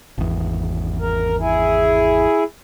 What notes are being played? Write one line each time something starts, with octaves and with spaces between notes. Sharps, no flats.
G#1 E2
A#4
E4 G#4